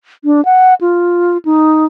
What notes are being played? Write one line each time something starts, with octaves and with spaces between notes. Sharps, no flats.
D4
F#5
F4
D#4